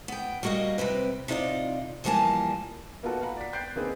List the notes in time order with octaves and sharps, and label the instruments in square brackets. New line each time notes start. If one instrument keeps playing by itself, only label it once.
[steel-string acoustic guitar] B3 G5
G3 A#3 F#4 D#5 F5
C3 G3 C4 B4
C3 D#4 F4 B4 D5 F5
E2 F3 G3 A#3 G#5 A5
[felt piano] A#3 B3 D#4 F4 F#4 A4
F5 F#5 A#5 B5
D5 B6
G5 F#6 G6 A6 C7 D7
D3 A#3 C4 D#4 G#4 B4